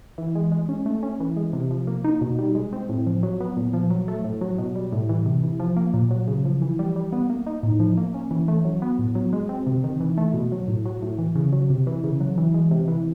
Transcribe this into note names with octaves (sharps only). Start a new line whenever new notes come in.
E3
G#3
G#3
C#4
A3
C#4
E3
G#3
C3
F3
A#3
D#4
B2
G3
G#3
C4
A2
F3
F#3
B3
A#2
F3
F#3
A3
A2
F#3
B2
G3
A2
E3
C3
E3
F3
A#3
A#2
F#3
C#3
F3
E3
G3
G3
B3
A#3
D#4
A2
F3
A#3
C#4
E3
A3
F#3
B3
A2
F#3
G#3
C4
C3
D#3
E3
A3
B2
F#3
A2
F#3
A2
E3
C#3
F#3
C3
E3
C#3
F#3
E3
G#3
C3
E3